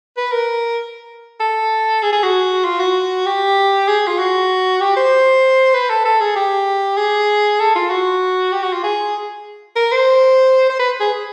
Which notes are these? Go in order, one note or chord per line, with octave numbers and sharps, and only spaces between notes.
B4
A#4
A4
G#4
G#4
F#4
F4
F#4
G4
G#4
F4
F#4
G4
C5
B4
A4
A4
G#4
G4
G#4
A4
F4
F#4
G4
F#4
F4
G#4
A#4
C5
C5
B4
G#4